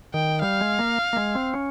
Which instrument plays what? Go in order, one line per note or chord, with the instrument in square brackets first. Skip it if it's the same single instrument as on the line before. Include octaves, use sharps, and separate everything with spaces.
[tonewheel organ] D#3 [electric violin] G5
[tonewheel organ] G3 [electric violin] F5
[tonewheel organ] G#3
A#3
A#3
G#3
C4
C#4